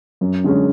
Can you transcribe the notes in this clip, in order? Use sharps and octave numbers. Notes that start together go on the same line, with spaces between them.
F#2
D3 G#3 C#4